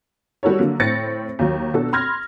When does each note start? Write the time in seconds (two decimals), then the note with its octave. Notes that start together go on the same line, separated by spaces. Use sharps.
0.43 G3 F#4 A4 A#4 C#5
0.59 D3 F#3 A#3
0.80 A2 C4 C5 A6 A#6 C#7
1.39 D#2 F#3
1.74 B2 D4 F#4 A4
1.93 B5 C6 F6 G#6 A#6